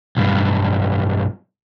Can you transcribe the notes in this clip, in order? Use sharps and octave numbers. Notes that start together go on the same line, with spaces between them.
B1 G2